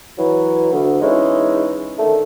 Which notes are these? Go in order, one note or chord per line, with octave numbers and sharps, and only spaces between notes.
E3 F#3
D2
E3 G#3 C#4 D#4 E4
D3 D#3 A3